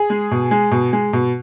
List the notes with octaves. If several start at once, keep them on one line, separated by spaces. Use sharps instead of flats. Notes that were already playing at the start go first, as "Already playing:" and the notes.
Already playing: G#4
G#3
B2
G#3
B2
G#3
B2